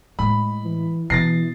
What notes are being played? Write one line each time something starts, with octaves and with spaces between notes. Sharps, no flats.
A2 G#3 B5
E3
B2 E3 A6 A#6 C7